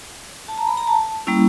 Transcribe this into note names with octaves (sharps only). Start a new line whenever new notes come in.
A5
A#5
B5
A#5
A5
G3 A#3 C#4 E4